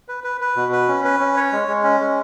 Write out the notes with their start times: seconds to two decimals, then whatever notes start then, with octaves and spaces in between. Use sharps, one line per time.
0.09 B4
0.24 B4
0.41 B4
0.56 B2
0.72 B4
0.88 C#4
1.05 B4
1.20 C#4
1.37 C#5
1.52 G#3
1.68 G#3
1.84 C#4
2.00 G#3